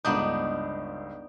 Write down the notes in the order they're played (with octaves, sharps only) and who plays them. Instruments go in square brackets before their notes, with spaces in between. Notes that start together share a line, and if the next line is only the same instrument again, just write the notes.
[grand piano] G1 C#2 G6 [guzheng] B3 D4 D#4